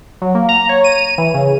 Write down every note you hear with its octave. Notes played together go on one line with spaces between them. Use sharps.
F#3
A#3
A#5
C#5
D#7
E3
C#3